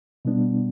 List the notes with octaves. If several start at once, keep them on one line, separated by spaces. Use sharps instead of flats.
B2 G3 B3 D4